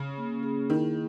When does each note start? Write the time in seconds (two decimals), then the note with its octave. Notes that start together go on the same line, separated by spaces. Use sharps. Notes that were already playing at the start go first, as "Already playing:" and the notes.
Already playing: C#3
0.17 A#3
0.43 G#4
0.69 D#3 E4